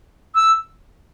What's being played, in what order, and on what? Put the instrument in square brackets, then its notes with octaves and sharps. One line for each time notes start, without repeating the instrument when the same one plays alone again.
[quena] E6